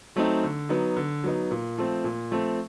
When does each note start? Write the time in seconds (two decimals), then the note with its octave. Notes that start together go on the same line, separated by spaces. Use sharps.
0.16 F#3 A3 C4 D#4
0.44 D3
0.69 F#3 B3 D#4
0.96 D3
1.24 F#3 B3 D#4
1.51 A#2
1.78 F3 A3 C4
2.04 A#2
2.31 F3 A3 C4